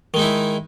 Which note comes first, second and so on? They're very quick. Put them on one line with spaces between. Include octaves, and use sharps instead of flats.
D#3 G#3 D#4 E4